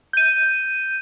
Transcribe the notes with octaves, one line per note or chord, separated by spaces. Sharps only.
G6 D#7